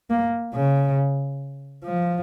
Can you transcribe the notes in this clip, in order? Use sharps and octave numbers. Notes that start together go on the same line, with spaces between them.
A#3
C#3
F3